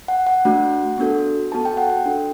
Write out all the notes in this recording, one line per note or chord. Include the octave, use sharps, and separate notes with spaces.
F#5
F#5
A3 D4 F#4
B3 D4 F#4 A4
B3 F#4 A4 A5
G5
F#5
G5
D4 F#4 A4